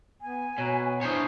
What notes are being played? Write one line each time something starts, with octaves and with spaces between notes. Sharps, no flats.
B3 G#5
B2 F#4 C#5 A#5
D4 E4 C5 C#5 G#5 D#6